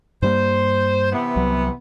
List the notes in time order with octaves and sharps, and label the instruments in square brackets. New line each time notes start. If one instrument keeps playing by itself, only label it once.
[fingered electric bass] G2 G3 A#3 [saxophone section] C5
[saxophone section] C3 E3 B3
[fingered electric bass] C2 F#3